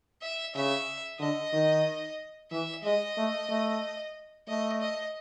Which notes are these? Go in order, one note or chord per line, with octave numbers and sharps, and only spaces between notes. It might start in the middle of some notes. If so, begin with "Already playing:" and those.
E5
C#3 E5
D3 D#5
D#3
E3 E5
G#3 D#5
A3
A3
A3 D#5
D#5